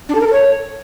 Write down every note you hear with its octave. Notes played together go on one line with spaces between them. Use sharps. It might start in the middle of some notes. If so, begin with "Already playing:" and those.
D4
A4
A#4
A4
C#5